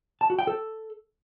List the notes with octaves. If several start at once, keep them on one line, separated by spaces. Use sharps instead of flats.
A5
F#4
G5
A4